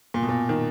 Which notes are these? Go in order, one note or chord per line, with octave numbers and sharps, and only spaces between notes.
A#2
B2
A#2
D#3